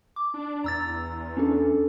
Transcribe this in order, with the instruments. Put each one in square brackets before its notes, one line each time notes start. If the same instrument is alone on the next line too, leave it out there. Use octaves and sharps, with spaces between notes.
[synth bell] D6
[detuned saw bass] D4
[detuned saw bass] E2 [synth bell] A#5 E6 A6
[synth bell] C#4 D4 A4